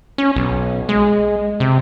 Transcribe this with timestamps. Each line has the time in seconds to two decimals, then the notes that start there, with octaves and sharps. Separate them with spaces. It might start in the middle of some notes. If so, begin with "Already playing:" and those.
0.18 C#4
0.36 B1
0.89 G#3
1.60 C3